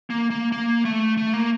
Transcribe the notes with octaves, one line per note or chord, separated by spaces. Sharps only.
A#3
A#3
A#3
A3
A3
A#3